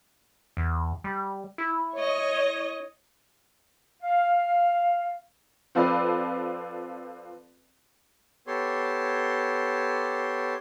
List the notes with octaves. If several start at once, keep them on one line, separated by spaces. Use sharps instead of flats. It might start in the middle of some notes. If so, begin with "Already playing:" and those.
E2
G3
E4
C#5 D#5
F5
F3 C4 F4 A4 B4 D5
B3 G4 A4 C#5 C6